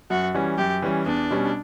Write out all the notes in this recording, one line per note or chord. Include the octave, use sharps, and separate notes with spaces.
F#2 F#4
E3 G3 C#4
F#2 G4
E3 G3 C#4
E2 D4
B2 G3 C#4